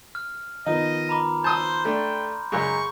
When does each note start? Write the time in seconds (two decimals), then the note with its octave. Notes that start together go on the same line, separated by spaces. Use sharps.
0.15 F6
0.66 D#3 F3 B3 D#4 D#5
1.09 A#5 B5 D6
1.44 C5 A5 C6 D#6 E6 G6
1.85 A3 D4 G5
2.52 F#2 C#3 G#3 G#4 C#6